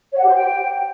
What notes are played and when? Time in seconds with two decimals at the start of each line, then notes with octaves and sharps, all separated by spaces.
0.13 C#5
0.18 F#5
0.24 G4
0.29 C5
0.34 G5